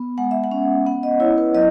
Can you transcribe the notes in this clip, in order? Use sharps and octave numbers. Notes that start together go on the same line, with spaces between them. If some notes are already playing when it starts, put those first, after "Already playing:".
Already playing: B3
G#3 F#5
E5
F#5
C#4
B3 F#5
D#5
E4 C#5
B4
F#3 D#5